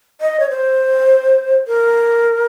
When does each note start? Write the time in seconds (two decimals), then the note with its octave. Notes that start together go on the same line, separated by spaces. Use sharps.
0.21 D#5
0.40 C#5
0.50 C5
1.67 A#4